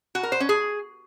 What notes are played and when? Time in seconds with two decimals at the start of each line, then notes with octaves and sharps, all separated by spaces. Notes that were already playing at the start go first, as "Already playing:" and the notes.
0.15 F#4
0.23 A#4
0.32 C5
0.40 C#4
0.49 G#4